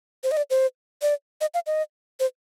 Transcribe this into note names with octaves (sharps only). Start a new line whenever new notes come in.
C5
D#5
D5
C5
D5
D#5
F5
D#5
C5